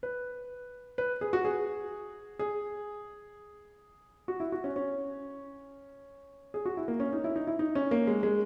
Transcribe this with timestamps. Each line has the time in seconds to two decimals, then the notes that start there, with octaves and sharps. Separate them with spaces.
0.03 B4
0.98 B4
1.21 G#4
1.33 F#4
1.45 G#4
2.39 G#4
4.28 F#4
4.40 E4
4.52 F#4
4.64 C#4
4.76 C#4
6.54 G#4
6.65 F#4
6.77 E4
6.88 A#3
7.00 C#4
7.13 D#4
7.24 E4
7.36 D#4
7.47 E4
7.59 D#4
7.75 C#4
7.91 A#3
8.07 G#3
8.23 G#3